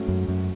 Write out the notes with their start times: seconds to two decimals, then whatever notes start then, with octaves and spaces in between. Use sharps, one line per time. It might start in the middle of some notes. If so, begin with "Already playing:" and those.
Already playing: G#2 F#3 A3 C#4 F#4
0.08 F#2
0.28 F#2